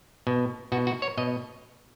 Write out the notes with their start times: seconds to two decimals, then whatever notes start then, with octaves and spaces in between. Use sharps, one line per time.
0.27 B2
0.72 B2 F#4
0.87 F#4
1.02 C#5
1.18 B2 D#5